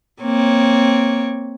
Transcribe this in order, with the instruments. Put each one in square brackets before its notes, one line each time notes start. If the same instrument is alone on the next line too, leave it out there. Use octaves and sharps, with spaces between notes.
[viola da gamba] A#3 C4 C#5